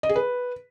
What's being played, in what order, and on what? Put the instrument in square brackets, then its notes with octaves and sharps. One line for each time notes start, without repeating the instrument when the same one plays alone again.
[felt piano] D#5
G#4
B4